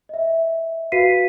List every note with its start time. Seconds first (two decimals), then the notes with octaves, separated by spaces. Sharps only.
0.09 D#5 E5
0.92 F#4 B4 F5 B6 C7 D#7